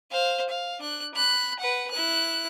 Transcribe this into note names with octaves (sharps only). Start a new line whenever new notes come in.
C5 F5
F5
D4 F#6
B5 F#6
B4 F#5
E4 F#6